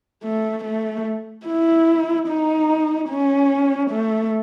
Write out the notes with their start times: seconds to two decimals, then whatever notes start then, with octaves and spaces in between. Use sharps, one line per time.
0.23 A3
0.65 A3
1.46 E4
2.28 D#4
3.10 C#4
3.91 A3